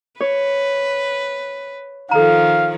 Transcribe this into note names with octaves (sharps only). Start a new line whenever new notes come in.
B4 C#5
D#3 F3 A4 F5 A#5